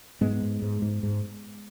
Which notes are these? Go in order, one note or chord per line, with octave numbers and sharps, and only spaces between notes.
G#2 G#3 B3
G#2
G#2
G#2
G#2